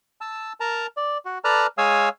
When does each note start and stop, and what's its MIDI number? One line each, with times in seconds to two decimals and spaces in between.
0.21 0.53 81
0.21 0.53 88
0.60 0.87 70
0.60 0.87 81
0.60 0.87 82
0.97 1.18 74
1.25 1.38 66
1.44 1.67 69
1.44 1.67 71
1.44 1.67 74
1.44 1.67 81
1.44 1.67 82
1.44 1.67 89
1.78 2.09 56
1.78 2.09 73
1.78 2.09 77
1.78 2.09 80
1.78 2.09 87
1.78 2.09 88